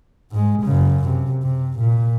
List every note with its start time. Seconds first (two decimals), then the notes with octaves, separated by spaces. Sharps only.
0.32 G#2 G#3
0.62 F#2 C#3
1.09 C3
1.43 C3
1.79 A#2